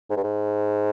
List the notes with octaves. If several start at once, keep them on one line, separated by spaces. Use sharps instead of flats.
G#2
G2
G#2